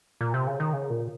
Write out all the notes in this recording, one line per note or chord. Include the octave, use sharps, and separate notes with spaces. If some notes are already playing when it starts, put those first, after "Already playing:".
A#2
C3
C#3
D#3
C#3
A#2